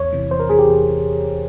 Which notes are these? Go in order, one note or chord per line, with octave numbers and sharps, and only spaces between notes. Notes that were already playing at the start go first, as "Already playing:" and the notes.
Already playing: E2 C#5
C3 E3
E2 C5
A#4
C3 E3 G#4
G4
E2